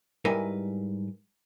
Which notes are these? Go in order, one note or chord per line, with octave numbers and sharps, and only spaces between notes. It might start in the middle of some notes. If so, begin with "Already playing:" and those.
G#2 G3 E4 A#4 B4 G#5